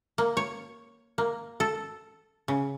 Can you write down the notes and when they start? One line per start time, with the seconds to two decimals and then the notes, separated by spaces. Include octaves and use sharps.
0.18 A#3
0.37 C#5
1.18 A#3
1.60 A4
2.48 C#3